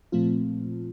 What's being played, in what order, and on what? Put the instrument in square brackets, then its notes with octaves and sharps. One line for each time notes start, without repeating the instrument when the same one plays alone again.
[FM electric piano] A#2 F3 A3 C4 F4